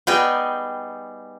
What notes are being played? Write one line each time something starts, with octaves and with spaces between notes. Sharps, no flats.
G3 B3 D#4 G#4 G5